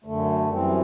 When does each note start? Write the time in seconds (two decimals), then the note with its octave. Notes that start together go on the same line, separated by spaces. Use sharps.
0.04 F#2 D3 A3
0.49 F#2 E3 G3 C4